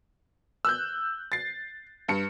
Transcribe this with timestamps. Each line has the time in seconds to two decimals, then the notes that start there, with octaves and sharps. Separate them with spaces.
0.65 E6 F#6 G6
1.32 A6 C7
2.08 G2 C#7